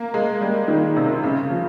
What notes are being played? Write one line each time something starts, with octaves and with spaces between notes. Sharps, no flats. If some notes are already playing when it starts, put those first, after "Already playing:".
Already playing: A#3
G#3
G3
D#3
C3
D#3
C#3
F3